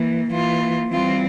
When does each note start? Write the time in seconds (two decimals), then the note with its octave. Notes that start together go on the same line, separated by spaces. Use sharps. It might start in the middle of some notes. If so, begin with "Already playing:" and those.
Already playing: E3 A#3
0.31 E3 A#3 F4
0.91 E3 G3 C4 F4